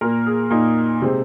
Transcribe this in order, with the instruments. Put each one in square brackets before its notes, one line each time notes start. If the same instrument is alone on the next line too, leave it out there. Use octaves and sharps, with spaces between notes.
[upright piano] A#2 A#3 A#4
G#4
A#2 A#3 D#4
C3 G#3 C4